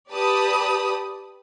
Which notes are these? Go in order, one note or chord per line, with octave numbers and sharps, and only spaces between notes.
G4 B4 D5 A5 B5 D#6